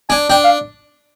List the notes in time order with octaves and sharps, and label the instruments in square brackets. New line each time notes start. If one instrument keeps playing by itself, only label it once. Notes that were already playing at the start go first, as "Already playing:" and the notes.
[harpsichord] D4 [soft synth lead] G#5
[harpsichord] D4 [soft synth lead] G5
[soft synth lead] F5